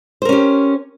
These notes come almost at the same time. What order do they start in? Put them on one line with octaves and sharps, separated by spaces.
C5 A#4 C#4 G4